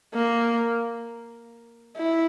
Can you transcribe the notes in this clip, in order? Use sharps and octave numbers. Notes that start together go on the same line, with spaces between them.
A#3
E4